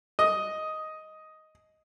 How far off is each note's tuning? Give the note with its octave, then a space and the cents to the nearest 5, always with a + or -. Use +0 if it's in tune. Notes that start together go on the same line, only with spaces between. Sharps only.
D#5 +5